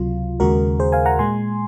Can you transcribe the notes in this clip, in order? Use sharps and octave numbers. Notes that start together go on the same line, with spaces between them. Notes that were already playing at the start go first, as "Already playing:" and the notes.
Already playing: C#2 C3 F#3 F4
D#2 C#3 G#3 F#4 A#4
G#4 C5
F5 G#5
F#5 A#5
A#2 G#3 G#5 C6